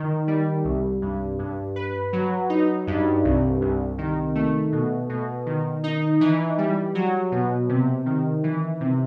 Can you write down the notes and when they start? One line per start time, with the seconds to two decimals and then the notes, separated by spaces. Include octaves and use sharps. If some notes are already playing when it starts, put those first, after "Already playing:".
Already playing: D#3
0.28 G3
0.64 C2
1.02 G2
1.39 G2
1.76 B4
2.13 F#3
2.49 D#4
2.87 G2
3.24 C2
3.61 C2
3.98 D#3
4.35 A3
4.72 B2
5.09 B2
5.46 D#3
5.84 D#4
6.21 E3
6.58 G3
6.95 F#3
7.32 B2
7.69 C3
8.06 D#3
8.44 E3
8.80 C3